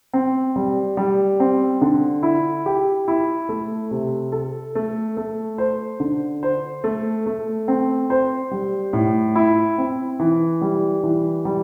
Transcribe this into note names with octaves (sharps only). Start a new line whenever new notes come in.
C4
G3
G3
C4
D3
E4
G4
E4
A3
C3
A4
A3
A3
C5
D3
C5
A3
A3
C4
C5
G3
A2
E4
C4
E3
G3
E3
G3